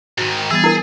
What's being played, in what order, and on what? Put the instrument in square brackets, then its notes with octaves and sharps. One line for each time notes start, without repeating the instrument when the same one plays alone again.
[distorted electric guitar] G#2 D#3 [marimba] F#4
[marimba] G5
[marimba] E3 G3 B3 [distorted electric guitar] G#4 [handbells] E6 A6
[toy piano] E4 A#4 [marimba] E6 G#6 [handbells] C7